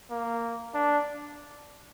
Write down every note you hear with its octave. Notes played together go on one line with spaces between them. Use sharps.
A#3
D4